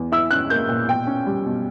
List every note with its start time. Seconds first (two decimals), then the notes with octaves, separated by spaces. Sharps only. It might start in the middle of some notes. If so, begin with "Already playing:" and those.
Already playing: E2
0.12 E4 E6
0.31 C#4 F#6
0.50 A#3 G6
0.69 A#2
0.88 B2 G5
1.07 C#4
1.26 G3
1.46 B2